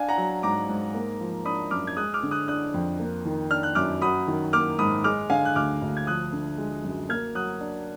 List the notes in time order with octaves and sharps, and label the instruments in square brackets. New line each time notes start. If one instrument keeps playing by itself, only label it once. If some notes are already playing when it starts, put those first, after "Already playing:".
Already playing: [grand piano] D4 F5 G#5
F#5 A#5
F#3
G#2 A#5 D6
G#2
A#3
F3
D4 B5 D#6
F#2 D6 F6
G#6
G#3 D#6 F#6
D6 F6
D3
D#6 F#6
D4 D#6 F#6
F2
A#3
D#3
D4 F6
F#6
F#2 D6 F6
F#3 B5 D#6
D#3
A#3 D6 F6
G#2 B5 D#6
G#3 D6 F6
D3 F5 G#5
F#6
D2 D6 F6
D2
G#6
F3 D#6 F#6
D3
G#3
F#2
A#3 F6 G#6
F#3 D#6 F#6
D4